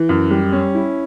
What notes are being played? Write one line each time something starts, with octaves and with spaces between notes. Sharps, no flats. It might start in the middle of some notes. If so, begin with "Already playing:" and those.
Already playing: E3
F#2
G3
C#4
E4